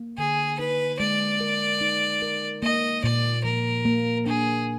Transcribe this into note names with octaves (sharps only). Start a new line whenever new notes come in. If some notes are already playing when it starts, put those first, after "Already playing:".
Already playing: A#3
D3 G#4
D#4 B4
G#3 D5
A#4
D#4
A#4
A#3 D#5
A#2 D5
F3 A#4
A#3
D4 G#4